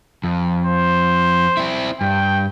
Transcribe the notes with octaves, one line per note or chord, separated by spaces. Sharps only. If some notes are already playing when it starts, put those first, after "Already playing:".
F2
C5
C4 E4
G2 G5